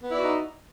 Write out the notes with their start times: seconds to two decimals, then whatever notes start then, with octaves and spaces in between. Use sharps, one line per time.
0.03 B3
0.08 E4
0.12 D5
0.17 F#4
0.21 D#4